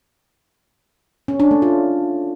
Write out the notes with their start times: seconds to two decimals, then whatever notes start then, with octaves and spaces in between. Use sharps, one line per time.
1.28 C#4
1.40 D4
1.51 A3
1.62 F4